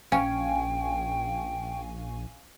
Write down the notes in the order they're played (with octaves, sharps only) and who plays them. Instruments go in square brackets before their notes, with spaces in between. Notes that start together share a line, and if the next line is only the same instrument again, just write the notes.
[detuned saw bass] A#1 [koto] C#4 [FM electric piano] F5 G#5 C#6 [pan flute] G5